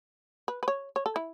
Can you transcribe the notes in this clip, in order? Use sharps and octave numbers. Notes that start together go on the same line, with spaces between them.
B4
B4
C#5
C#5
A4
E4